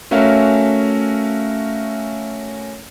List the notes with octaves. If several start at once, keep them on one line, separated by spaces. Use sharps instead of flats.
A3 C#4 F#4 A#4 E5 F5